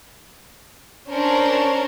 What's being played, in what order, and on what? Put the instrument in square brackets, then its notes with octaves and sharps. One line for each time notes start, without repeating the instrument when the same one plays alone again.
[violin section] C#4 D4 A#4 C5 C#5